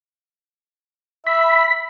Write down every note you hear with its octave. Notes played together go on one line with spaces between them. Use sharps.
E5 B5